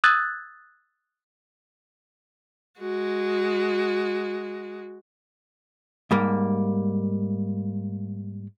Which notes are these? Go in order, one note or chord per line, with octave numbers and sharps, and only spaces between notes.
D#6 E6 F#6 G#6 A6
G#3 F#4
G#2 G3 A#3